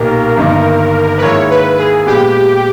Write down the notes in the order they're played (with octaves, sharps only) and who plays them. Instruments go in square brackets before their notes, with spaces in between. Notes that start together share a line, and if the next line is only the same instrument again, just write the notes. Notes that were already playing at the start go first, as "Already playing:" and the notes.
Already playing: [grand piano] B1 A#2 A#3 D#4 G4 [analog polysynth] A#4
[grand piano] G1 G2 D#3 A#3 D#4
[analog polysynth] B4
[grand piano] G#2 D#3 A#3 E4 [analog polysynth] C#5
[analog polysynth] B4
G#4
[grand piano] A#2 G#3 B3 [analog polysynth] G4